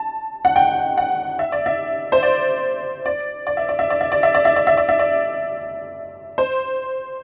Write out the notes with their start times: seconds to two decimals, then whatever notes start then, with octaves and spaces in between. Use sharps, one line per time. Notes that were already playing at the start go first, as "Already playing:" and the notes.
Already playing: A5
0.45 F#5
0.56 G5
0.98 F#5
1.39 E5
1.52 D5
1.66 E5
2.12 C5
2.23 D5
3.06 D5
3.47 D5
3.57 E5
3.69 D5
3.79 E5
3.90 D5
4.01 E5
4.12 D5
4.23 E5
4.35 D5
4.45 E5
4.56 D5
4.67 E5
4.77 D5
4.89 E5
4.99 D5
6.38 C5